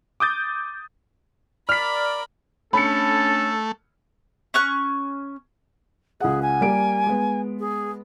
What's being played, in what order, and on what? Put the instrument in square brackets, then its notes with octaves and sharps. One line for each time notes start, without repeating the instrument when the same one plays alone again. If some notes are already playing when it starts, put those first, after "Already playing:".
[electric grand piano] D6 D#6 G6 A6
[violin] A#4 B5 [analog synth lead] D5 [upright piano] F6 B6
[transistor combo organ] A3 [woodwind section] C#4 D4 [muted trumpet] A4 [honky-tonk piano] B5 C#7
[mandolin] C#4 C#6 F#6
[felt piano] C#2 F#5 [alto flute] G#4
[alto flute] G#5
[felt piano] G3 A#3 D7
G#3 B3
[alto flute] G#4